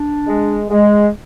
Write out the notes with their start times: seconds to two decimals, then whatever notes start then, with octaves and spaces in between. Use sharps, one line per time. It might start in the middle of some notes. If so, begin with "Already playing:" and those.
Already playing: D4
0.28 G#3
0.69 G#3